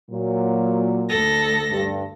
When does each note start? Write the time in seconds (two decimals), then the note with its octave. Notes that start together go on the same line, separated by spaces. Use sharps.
0.11 A#2 F#3
1.09 D2 A4 A#6
1.71 G2